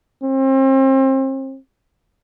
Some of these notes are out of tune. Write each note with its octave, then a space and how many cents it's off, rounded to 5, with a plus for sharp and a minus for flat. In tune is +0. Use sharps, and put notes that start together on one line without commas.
C4 +35